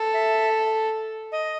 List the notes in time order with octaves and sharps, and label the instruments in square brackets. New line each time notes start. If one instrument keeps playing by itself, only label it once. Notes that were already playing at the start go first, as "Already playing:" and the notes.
Already playing: [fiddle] A4
[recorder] E5
D#5